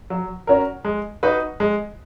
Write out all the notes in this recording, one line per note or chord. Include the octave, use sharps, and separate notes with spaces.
F#3
C#4 F#4 A#4
G#3
D#4 F#4 B4
G#3